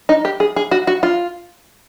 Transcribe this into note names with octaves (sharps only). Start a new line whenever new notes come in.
D#4
G4
G#4
G#4
F#4
F#4
F4